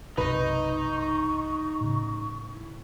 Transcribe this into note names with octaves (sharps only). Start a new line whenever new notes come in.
B1 F#2 C3 D#4 B4 D#5 C#6
A2 C#3
E4